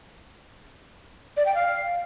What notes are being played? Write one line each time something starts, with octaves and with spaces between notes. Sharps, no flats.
D5
G5
F5